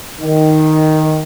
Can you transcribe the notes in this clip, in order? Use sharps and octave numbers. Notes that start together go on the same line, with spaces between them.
D#3